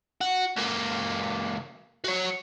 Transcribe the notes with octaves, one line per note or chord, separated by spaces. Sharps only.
F#4
C#2 A#3
F#4 C#5